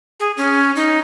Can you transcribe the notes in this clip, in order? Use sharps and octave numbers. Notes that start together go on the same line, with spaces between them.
G#4
C#4
D#4